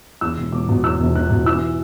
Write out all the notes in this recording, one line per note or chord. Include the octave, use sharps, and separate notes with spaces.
E2 E6
E1
E1 D6
B2
E2 E6
E1
E1 F#6
B2
E3 E6